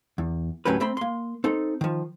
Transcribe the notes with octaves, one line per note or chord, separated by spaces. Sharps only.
E2
D2 A2 F#3 C#4 G4 B4
A3 C4 B5 C6
A#3 C6
C4 D#4 A4
D#3 F3